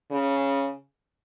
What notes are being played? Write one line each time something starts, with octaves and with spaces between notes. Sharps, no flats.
C#3